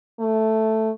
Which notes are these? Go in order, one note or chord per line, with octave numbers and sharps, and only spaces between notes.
A3